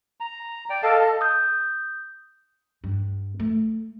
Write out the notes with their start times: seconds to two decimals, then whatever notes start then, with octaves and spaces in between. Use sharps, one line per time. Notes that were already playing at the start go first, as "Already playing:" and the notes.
0.20 A#5
0.70 D5 G5
0.83 A4 D#5 F5 A5
1.21 D#6 G6
2.84 G2
3.40 A3